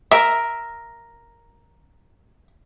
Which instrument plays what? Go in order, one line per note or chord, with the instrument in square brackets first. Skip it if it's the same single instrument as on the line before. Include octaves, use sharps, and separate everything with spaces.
[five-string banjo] A#4 E5